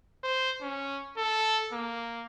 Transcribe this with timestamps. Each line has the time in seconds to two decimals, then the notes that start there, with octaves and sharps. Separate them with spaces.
0.24 C5
0.62 C#4
1.17 A4
1.73 A#3